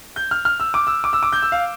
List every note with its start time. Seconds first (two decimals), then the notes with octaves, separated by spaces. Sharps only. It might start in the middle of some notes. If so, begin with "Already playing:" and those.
0.16 G6
0.31 F6
0.45 F6
0.60 E6
0.74 D6
0.87 E6
1.04 D6
1.13 E6
1.23 D6
1.32 G6
1.42 E6
1.52 F5